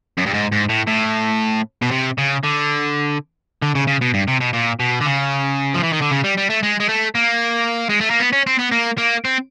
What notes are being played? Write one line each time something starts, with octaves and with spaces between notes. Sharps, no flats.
F#2
G2
G#2
G#2
A2
A2
B2
C3
C#3
D3
D3
C#3
C#3
B2
G2
C3
B2
A#2
B2
D3
C#3
F3
E3
D#3
D3
C#3
G3
G3
A3
G#3
G#3
A3
A#3
G#3
A3
A#3
B3
C#4
C4
B3
A#3
A#3
C4